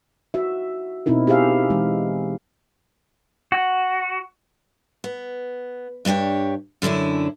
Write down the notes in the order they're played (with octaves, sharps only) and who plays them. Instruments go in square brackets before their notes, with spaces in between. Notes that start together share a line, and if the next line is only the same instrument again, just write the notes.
[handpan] F#4 E5
B2 C4 D#4 E4 A#4
G4 G#4 C5 E5 F5
E3 G#3
[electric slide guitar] F#4
[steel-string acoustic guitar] B3
G2 D4 F4 G4 C#5
F#2 D3 C#4 D4 E4